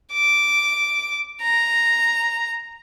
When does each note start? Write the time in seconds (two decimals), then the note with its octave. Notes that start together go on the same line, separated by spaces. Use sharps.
0.13 D6
1.42 A#5